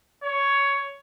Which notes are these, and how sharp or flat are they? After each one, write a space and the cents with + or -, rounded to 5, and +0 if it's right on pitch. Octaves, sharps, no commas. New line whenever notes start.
C#5 +10